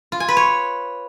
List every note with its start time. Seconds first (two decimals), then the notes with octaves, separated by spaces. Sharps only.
0.12 F4
0.20 G#5
0.29 B4
0.37 C#5